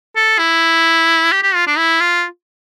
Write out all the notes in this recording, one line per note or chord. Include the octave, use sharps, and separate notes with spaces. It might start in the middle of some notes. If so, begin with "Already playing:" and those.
A4
E4
G4
G4
F4
D4
E4
F4